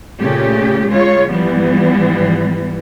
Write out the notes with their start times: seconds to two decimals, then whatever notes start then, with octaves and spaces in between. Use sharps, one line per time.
0.19 A#2 C#3 A3 C#4 G4
0.87 C#3 G#3 F4 C#5
1.29 G#2 E3 F3 G3 B3